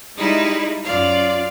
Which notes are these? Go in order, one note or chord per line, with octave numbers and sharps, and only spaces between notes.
G3 G#3 D#4 E4
F#2 F4 D5 F5